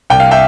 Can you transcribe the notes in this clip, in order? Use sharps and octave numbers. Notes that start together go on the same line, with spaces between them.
C2 G5
F5
E5 G5